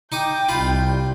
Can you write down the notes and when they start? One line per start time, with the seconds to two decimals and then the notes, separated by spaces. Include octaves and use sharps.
0.12 D#4 G5 D6 D#6
0.49 C2 F4 B5